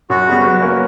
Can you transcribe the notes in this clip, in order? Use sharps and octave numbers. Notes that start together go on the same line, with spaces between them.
F#2 F#4
C#3 G3 B3
F#3
A#3 C#4 F#4 B4